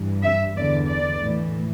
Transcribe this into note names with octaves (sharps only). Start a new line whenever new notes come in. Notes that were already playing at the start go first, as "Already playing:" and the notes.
Already playing: G2 E3
E5
E2 D3 D5
D5
A2 E3